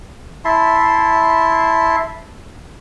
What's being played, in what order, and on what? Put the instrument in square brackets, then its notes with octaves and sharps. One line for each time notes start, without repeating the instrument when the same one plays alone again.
[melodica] E4 E5 A5 C6